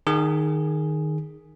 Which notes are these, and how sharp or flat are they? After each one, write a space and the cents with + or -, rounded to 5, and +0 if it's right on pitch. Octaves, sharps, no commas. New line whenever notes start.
D#3 -15 G#4 +0